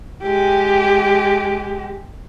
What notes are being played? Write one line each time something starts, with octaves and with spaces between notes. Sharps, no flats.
G#3 G4